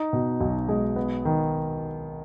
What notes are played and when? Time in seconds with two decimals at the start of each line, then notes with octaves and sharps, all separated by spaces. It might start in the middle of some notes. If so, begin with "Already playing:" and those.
Already playing: D#4
0.13 B2
0.41 B1
0.69 G#3
0.96 B3
1.25 D#3